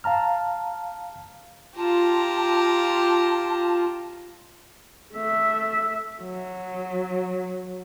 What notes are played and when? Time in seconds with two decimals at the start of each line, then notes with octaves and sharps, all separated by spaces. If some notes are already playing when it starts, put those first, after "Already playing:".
0.04 F5 A5 A#5 F6
1.77 F4 G4 A5 A#5
5.14 A3 E5
6.23 F#3